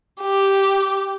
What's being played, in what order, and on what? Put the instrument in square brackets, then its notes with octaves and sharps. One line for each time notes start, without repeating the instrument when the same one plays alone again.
[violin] G4